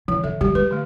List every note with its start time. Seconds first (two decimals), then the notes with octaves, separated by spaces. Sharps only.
0.08 E3 F3
0.24 D3 A4 E5
0.41 D3 G3 G4
0.55 G#3 B4
0.71 D3 A3